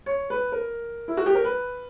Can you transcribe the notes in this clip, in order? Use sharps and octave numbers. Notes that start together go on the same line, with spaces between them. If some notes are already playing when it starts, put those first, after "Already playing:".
C#5
B4
A#4
E4
F#4
G4
A#4
B4